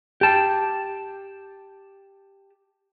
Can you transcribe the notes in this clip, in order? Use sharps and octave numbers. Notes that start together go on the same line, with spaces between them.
G4 A5